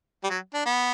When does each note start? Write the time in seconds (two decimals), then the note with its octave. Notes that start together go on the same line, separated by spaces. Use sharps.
0.24 G3
0.30 F#3
0.54 D4
0.66 B3